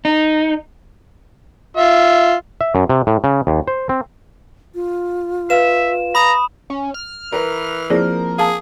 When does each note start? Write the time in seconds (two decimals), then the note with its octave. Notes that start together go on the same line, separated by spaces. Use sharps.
0.05 D#4
1.77 F4 E5
2.61 E5
2.75 F#2
2.90 C3
3.07 A2
3.24 C#3
3.47 D#2
3.68 C5
3.89 C4
4.75 F4
5.50 B4 E5 F5 E7
6.15 A#5 B5 D#6
6.70 C#4
6.94 F6
7.32 E3 A#4 B4
7.90 F3 A#3 C4 E4 G#4 A#4 D5
8.38 G#4 F5 A5 D#6